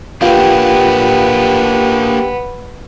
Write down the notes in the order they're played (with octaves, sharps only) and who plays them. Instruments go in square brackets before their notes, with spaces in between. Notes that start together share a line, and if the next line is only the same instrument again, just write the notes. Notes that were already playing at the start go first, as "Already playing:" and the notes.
[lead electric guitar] A#3 D4 [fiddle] B3 [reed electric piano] F4 F5 [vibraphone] G4 G5